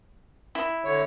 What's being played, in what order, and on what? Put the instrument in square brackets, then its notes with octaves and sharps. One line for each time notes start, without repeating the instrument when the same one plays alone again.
[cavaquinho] E4
[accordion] D3 C#5